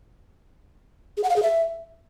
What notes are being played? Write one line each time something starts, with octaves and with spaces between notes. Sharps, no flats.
G#4
F#5
F5
G#4
E5